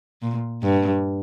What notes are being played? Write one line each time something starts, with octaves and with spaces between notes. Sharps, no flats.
A#2
G2